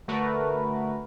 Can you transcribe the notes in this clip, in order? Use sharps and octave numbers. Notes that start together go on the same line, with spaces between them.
D3 A3 F#4 A#4 B4